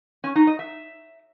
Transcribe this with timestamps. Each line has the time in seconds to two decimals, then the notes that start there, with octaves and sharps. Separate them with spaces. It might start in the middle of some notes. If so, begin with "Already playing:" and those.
0.24 C#4
0.35 D#4
0.47 D#5
0.59 E5